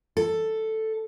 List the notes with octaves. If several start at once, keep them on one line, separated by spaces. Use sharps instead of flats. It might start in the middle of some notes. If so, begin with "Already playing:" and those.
A4